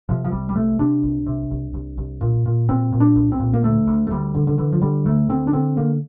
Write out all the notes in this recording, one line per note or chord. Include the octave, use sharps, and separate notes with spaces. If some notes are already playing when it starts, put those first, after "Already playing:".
C3 F3
F3
C2 G3
G3
C3 A3
C3 D4
C2
C3
C2
C2
C2
A#2
A#2
A#2 C4
A#2
D4
C2
C4
A#2
A#3
D2 A3
D2
A3
D2 G3
D3
D3
D3 E3
F3
D3 G3
D2 A3
D3 C4
D4
D3 C4
D3 A#3